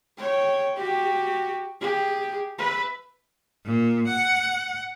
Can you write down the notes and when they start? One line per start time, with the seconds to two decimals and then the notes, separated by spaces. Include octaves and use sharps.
0.17 C#5 G5
0.77 F#4 G4
1.81 G4 G#4
2.59 B4 E5
3.65 A#2
4.08 F#5